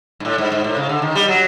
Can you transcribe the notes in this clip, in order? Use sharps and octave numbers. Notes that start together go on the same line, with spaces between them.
G#2
A2
G#2
G#2
A2
C#3
D3
D#3
G3
F#3